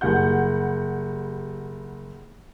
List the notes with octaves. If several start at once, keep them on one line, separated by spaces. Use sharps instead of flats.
F#1 G3 F#5 G6